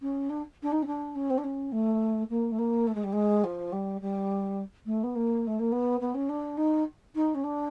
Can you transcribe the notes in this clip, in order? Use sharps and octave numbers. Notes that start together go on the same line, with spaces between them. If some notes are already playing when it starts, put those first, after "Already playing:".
C#4
D4
D4
D#4
C#4
D4
C#4
C4
D4
C#4
A3
A#3
A3
A#3
A3
G#3
G3
G#3
F3
G3
G3
A3
B3
A#3
A3
A#3
B3
B3
C#4
D4
D#4
D#4
C#4
D4